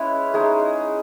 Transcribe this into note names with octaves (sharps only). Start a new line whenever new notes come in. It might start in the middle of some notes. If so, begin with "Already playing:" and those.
Already playing: G#3 C#4 E4 B4
G#3 D#4 G#4